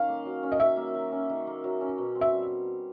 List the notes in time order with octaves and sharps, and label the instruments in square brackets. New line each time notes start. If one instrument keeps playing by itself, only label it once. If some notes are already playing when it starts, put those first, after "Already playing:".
Already playing: [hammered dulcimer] D#3 C#4 [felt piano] F5
[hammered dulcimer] A#3
F#3
C#4
[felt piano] D#5
[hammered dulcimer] D#3 [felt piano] E5
[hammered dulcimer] A#3
F#3
C#4
D#3
A#3
F#3
C#4
B2
C4
[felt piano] E5
[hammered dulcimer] G3